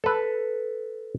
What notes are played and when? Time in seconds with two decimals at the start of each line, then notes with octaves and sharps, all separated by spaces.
0.04 A4 B4